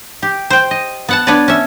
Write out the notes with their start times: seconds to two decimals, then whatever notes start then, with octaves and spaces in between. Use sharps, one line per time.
0.22 G4
0.50 C5 G5
0.71 D#5
1.09 B3 F#5 A5
1.27 B3 D4 B4 C#5 D5
1.48 C#4 E5